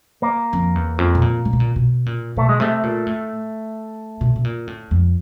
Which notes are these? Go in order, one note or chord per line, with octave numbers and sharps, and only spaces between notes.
A#3
F2
E2
F2
B2
A#2
A#2
B2
A#2
B2
A#2
B2 A3
G#3
C3 A3
A#2
A2
B2
B2
A#2
A2
F2